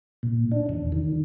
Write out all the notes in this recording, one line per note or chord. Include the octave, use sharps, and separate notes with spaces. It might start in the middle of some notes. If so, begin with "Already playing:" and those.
A#2
D4
E2
D#3